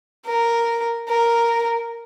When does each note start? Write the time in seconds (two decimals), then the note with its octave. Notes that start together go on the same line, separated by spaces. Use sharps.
0.25 A#4
1.08 A#4